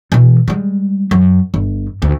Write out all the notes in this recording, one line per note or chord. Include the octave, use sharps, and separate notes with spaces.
B2 E3
G3 G#3
F#2
G1
D2